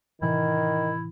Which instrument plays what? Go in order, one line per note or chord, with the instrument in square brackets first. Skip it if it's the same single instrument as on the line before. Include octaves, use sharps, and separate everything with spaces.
[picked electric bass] A2 C3 E3 [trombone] D#3 [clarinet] E4